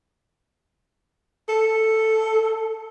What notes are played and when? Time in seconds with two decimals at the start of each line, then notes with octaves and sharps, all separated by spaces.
1.49 A4